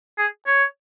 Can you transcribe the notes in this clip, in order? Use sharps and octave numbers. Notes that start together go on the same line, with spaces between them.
G#4
C#5